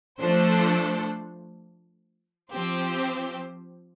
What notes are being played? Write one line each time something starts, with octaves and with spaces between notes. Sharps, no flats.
F3 A3 D4 A4 C5
F3 C4 G4 C5